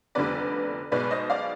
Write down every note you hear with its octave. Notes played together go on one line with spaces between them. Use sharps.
F1 F2 D3 G3 B3 B4 D5
B1 B2 G#3 B3 B4 D5
C5 D#5
D5 F5